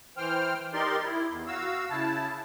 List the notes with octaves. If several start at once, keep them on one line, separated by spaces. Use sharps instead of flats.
E3 C5 G5 F6
D#4 G4 A#4 D5 C6
E4
E2
F#4 F5 E6
C#3 E4 A5